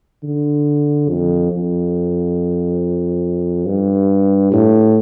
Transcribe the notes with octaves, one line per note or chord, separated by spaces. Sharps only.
D3
F2
F2
G2
A2